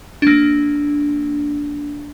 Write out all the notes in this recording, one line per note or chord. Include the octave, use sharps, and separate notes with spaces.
A#3 D4